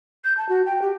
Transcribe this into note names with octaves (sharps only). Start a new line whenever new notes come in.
G6
A5
F#4
G5
G4